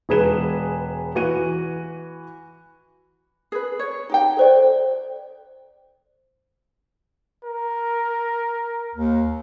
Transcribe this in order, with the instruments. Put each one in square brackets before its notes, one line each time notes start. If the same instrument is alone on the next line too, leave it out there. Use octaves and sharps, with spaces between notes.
[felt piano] E1 G#4 B4 E7
E3 F#4 D#7
[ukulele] G#4 B4
C#5
D#4 G4 G5
[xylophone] A4 C5 D5
[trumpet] A#4
[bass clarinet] D#2